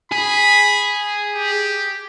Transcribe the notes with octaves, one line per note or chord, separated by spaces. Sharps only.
G#4 B5
G4